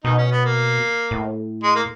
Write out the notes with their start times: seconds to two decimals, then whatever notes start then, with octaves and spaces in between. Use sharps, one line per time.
0.04 B2 D#3 D#4
0.18 C#4
0.32 B3
0.45 A#3
1.11 A2
1.64 G#3
1.75 A#3